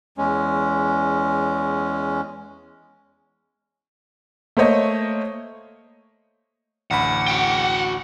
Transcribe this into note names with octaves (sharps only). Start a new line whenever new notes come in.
E2 G#3 C#4
A3 A#3 C5 C#5 D#5
A1 D2 F#5 B5
F#4 G5